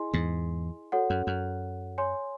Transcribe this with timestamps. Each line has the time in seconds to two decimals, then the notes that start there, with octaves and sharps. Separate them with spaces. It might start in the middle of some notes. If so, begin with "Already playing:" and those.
Already playing: E4 G#4 D#5 G#5 C6
0.14 E2 G#2
0.92 F#4 A4 C#5 F#5
1.10 F#2
1.27 F#2
1.98 C#5 G#5 C6